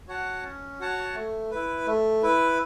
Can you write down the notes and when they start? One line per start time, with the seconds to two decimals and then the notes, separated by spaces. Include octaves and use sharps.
0.08 F#4 C#5 F#5 A5
0.43 C#4
0.80 F#4 C#5 F#5 A5
1.15 A3
1.51 E4 B4
1.86 A3
2.23 E4 B4